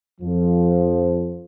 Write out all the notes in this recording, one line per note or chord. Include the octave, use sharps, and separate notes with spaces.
F2 F3